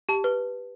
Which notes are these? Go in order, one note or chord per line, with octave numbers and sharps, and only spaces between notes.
G4 A5
B4